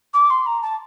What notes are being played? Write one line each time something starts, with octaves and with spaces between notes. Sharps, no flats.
D6
C6
A#5
A5